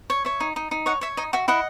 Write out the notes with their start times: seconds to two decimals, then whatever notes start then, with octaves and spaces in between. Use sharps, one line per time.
0.10 C#5
0.25 C#5 E5
0.40 D#4
0.56 D#4
0.71 D#4
0.86 C#5 D#5 F#5
1.01 C#5 E5
1.17 D#4 D#5
1.33 F#4 E5
1.48 E4 D#5 F#5